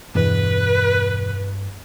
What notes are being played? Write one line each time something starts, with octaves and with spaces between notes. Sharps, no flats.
E2 G2 B2 B4